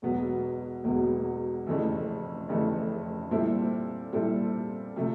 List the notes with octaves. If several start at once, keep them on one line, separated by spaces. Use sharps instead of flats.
E1 E2 B2 F#3 B3
E1 E2 B2 F#3 B3
F1 F2 C#3 E3 A3
F1 F2 C#3 E3 A3
A#2 G3 C4 E4 A4
A#2 G3 C4 E4 A4
C3 F3 A3